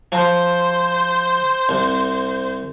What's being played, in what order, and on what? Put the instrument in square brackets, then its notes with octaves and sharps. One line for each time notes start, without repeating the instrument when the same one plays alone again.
[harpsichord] F3 [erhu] C5
[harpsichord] C2